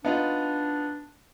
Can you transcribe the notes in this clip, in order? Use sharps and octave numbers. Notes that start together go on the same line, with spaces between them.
B3 D4 D#4 F4